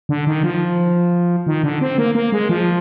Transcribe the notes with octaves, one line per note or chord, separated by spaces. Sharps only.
D3
D#3
F3
D#3
D3
C4
A#3
A#3
G#3
F3